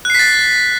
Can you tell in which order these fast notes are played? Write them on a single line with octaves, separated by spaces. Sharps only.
F#6 C7 B6 A6